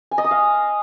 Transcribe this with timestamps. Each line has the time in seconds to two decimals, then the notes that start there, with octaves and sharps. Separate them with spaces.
0.11 G#5
0.18 D#5
0.24 D#6
0.31 F5